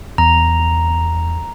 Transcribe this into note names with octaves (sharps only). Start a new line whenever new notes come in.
E2 A#5